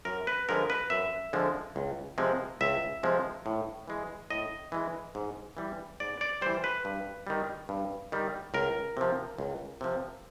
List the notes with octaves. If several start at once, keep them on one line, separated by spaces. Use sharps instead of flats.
F#2 A#4
B4
D3 F3 G#3 A#4
B4
F#2 E5
D3 F3 G#3
C#2
C3 F3 G#3
C#2 E5
C3 F3 G#3
A2
E3 G#3
A2 D#5
E3 G#3
G#2
E3 G3
G#2 D5
D5
E3 G3 C5
B4
G2
D#3 G3
G2
D#3 G3
C#2 A#4
C3 F3
C#2
C3 F3